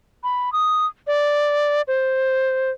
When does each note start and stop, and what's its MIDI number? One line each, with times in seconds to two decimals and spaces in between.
0.24 0.52 83
0.53 0.86 87
1.07 1.81 74
1.88 2.71 72